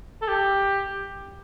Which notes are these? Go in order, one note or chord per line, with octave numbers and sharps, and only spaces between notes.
A4
G4